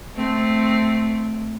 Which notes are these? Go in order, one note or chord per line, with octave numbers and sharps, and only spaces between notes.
A3 C4